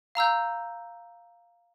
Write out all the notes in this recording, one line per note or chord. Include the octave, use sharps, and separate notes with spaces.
F5 A#5 E6 G6